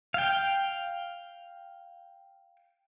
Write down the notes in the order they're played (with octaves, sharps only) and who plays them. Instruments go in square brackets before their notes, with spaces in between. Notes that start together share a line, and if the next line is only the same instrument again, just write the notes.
[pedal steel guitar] F5 G5